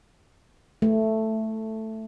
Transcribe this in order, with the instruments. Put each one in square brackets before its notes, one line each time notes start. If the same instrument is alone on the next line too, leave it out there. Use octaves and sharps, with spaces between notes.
[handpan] A3